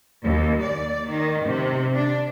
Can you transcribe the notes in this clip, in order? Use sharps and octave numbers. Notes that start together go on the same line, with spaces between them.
D#2
D5
D#3
C3
D4